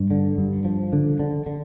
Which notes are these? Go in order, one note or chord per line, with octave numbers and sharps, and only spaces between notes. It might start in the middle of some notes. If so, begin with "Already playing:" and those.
Already playing: G2
D3
G2
F3
D3
D3
D3